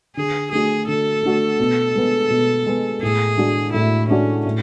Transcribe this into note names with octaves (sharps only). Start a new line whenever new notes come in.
D3 G#4
A3 D4 F#4 G#4
D3 A4
A3 D4 F#4
B2
G#3 B3
B2
G#3 B3
A2 G#4
G#3 D4 F#4
A2 E4
G#3 C#4 D4 F#4
A2